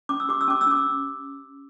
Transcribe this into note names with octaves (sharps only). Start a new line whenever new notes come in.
C#4 D6
E6
G4 D6
E6
C#4 D6
E6
C#4 D6